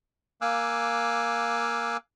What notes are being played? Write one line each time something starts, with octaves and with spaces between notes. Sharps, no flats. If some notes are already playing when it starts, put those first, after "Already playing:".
A#3 F5 G#5 D6 E6 F#6